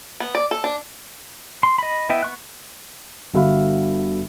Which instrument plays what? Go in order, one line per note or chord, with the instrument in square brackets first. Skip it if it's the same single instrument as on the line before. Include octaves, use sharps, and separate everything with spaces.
[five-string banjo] B3
D5
A4
D4
[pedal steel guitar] C6
D#5 B5
B3 E4 D#5 E5 G5
B3 C#6 F#6
[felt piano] G1 D3 F#4 E5 F5 B5